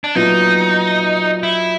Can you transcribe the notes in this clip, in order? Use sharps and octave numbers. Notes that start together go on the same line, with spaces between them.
D4
A#2 F#3 B3 D#4 E4
E4